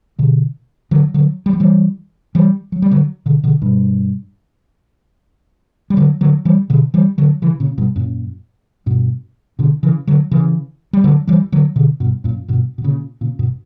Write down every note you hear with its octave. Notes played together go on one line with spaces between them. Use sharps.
B2 D3
D3 F#3
D3 F#3
G3
F#3
E3 G3
E3 G3
F#3
G3
D3 F#3
B2 D3
B2 D3
G2 B2
G3
D3 F#3
D3 F#3
E3 G3
B2 D3
E3 G3
D3 F#3
C#3 E3
A#2 C#3
G2 B2
F#2 A#2
G2 B2
B2 D3
C#3 E3
D3 F#3
C#3 E3
G3
D3 F#3
E3 G3
D3 F#3
B2 D3
G2 B2
F#2 A#2
G2 B2
B2
A#2 C#3
A#2 C#3
G2 B2